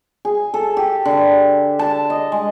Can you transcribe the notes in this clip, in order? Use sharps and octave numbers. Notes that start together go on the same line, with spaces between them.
G#4
A4
G4
D3
A5
D#5
G#3